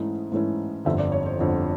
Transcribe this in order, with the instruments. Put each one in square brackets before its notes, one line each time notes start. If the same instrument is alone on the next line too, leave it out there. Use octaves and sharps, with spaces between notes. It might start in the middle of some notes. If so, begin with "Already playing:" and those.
Already playing: [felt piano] G#2 E3 A3 C#4 E4 D#5
G#2 E3 A3 C#4 E4
G1 F2 D3 E5
D5
C#5
C5
G1 F2 D3